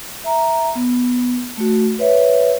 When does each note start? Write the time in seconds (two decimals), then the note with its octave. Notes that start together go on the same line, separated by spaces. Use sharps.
0.24 E5 A#5
0.75 B3
1.57 A3 F#4
1.99 B4 C#5 E5